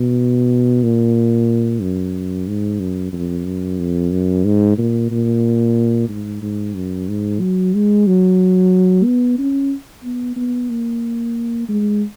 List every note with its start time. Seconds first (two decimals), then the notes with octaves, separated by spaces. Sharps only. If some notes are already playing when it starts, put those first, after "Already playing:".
Already playing: B2
0.83 A#2
1.81 F#2
2.48 G#2
2.80 F#2
3.13 F2
3.46 F#2
3.79 F2
4.12 F#2
4.45 G#2
4.78 A#2
5.11 A#2
6.09 G#2
6.42 G#2
6.75 F#2
7.08 G#2
7.40 F#3
7.74 G#3
8.07 F#3
9.05 B3
9.38 C#4
10.04 B3
10.36 B3
10.69 A#3
11.69 G#3